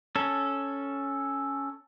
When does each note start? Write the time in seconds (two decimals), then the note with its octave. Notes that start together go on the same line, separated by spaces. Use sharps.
0.16 C#4 A4